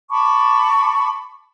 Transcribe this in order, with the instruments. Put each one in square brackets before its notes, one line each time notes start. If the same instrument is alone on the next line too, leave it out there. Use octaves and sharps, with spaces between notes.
[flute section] A5 B5 C#6 D6